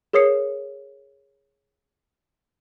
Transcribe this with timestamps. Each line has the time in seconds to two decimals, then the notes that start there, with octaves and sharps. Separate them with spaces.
0.13 G#4 A#4 C#5 D#6 C7 C#7